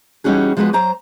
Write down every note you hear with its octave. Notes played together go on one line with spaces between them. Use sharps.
E3 G3 C#4 D#4 F#4 G#4
F3 G#3 B3 F#4 A4 B4
F#3 C5 A#5